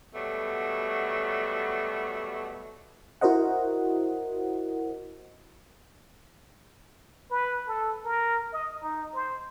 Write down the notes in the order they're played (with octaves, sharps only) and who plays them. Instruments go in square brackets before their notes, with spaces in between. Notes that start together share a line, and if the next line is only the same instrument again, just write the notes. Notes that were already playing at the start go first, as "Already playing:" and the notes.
[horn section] B2 F#3 G3 A3
[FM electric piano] E4 F#4 A#4 C5 D#5 F#5
[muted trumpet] B4
A4
A#4
D#5
D#4
C5